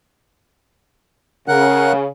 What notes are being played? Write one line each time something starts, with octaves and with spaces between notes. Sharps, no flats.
C#3 A#4 F#5 F#6